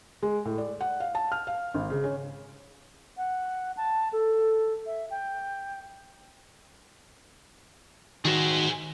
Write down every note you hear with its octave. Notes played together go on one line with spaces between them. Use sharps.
G#3
A2
D5
F#5
F5
A5
F6
F5
G#1
C#3
C#4
F#5
A5
A4
E5
G5
D#3 F#4 G#4 C5